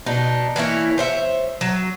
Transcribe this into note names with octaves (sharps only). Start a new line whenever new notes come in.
B2 D4 D#4
E3 A#3 E4 C#5
C5 C#5 E5
F#3